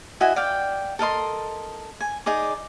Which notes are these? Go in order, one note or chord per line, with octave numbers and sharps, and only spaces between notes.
E4 F#4 D#5 G#5
D5 F5 G5
A4 A#4 D#5 C6
G#5
D#4 G#4 D5